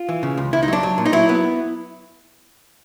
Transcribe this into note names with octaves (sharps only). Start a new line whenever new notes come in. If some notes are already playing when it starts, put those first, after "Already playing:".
Already playing: F4
E3
C#3
C#2
C#2 E4
D#4
F#3 D4
F#3
A#2
D#4
F#3 E4
B3